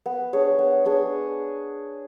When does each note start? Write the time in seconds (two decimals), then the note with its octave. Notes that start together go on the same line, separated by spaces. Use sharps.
0.06 B3
0.33 D4 G#4 C#5
0.59 B3
0.85 D4 G#4 C#5